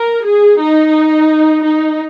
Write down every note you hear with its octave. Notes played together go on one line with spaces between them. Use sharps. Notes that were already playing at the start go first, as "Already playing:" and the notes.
Already playing: A#4
G#4
D#4
D#4